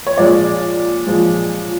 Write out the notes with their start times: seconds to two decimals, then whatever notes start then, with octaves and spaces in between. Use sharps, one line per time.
0.07 C#5
0.18 A#2 F3 G#3 D5
1.07 A#2 F3 G#3